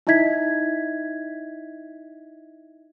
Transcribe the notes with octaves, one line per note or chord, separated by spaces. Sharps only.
D#4 E4 D#5 E5 G#6 B6